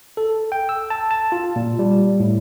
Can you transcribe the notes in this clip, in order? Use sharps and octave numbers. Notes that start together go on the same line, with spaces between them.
A4
G5
E6
A5
A5
F4
A#2
G3
A2